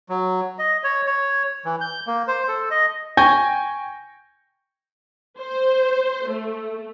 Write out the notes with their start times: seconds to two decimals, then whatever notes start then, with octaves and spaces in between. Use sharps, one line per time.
0.09 F#3
0.59 D#5
0.84 C#5
1.07 C#5
1.65 E3
1.81 G6
2.07 A#3
2.28 C5
2.48 A4
2.71 D#5
3.17 G5 G#5 C#6 G6 G#6 A#6
5.39 C5
6.28 A3